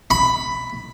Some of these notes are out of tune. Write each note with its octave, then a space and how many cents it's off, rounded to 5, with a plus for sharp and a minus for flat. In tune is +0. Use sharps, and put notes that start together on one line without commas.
B5 +10